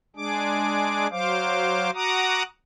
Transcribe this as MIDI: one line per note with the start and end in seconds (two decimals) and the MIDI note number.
0.16 1.07 56
0.16 1.07 62
0.16 1.07 68
0.16 1.07 86
1.11 1.90 54
1.11 1.90 72
1.11 1.90 77
1.11 1.90 86
1.95 2.43 66
1.95 2.43 78
1.95 2.43 82
1.95 2.43 86
1.95 2.43 87